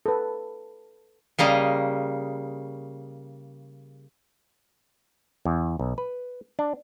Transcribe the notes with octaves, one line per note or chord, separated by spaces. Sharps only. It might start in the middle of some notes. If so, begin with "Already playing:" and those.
A4 B4
C#3 G3 A#3 D#5
E2
B1
B4
D4